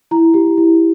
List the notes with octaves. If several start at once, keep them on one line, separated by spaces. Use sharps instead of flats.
E4 A#5
G4
E4